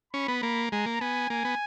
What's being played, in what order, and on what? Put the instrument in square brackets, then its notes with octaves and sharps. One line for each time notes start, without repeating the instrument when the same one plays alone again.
[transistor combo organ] C#4 [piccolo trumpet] B5
[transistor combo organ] B3
A#3
[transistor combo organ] G#3 [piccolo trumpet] A#5
[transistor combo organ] A#3
[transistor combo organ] B3 [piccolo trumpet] G#5
[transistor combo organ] A#3 [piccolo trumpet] G#5
[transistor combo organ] B3